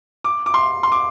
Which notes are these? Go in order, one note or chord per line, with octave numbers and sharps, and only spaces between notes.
D6
D6
C6
C6
D6